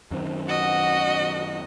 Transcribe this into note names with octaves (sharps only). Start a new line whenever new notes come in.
F#2 D#3 C4
F#4 D#5 F#5 E6